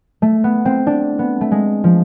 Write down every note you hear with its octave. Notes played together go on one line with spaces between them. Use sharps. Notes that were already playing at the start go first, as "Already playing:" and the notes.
A3
B3
C4
D4
B3
A3
G#3
F3